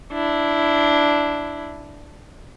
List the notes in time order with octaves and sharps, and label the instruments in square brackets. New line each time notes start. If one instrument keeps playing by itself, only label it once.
[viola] D4 E4